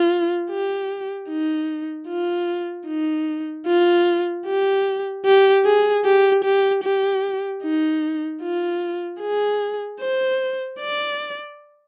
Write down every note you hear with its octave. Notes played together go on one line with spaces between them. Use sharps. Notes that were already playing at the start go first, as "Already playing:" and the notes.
Already playing: F4
G4
D#4
F4
D#4
F4
G4
G4
G#4
G4
G4
G4
D#4
F4
G#4
C5
D5